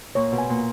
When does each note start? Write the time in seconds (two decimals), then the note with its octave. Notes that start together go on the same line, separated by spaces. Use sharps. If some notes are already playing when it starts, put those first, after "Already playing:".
0.15 A#2 C#5
0.32 B2
0.38 G#5
0.50 A#2